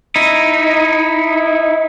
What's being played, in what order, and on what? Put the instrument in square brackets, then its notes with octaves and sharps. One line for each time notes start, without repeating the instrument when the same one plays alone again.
[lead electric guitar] D#4 E4